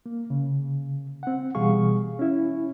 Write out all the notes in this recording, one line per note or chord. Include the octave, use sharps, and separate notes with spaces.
A#3
C#3
C4 F#5
B2 E3 G3 G#4 F5 C#6
C#4 E4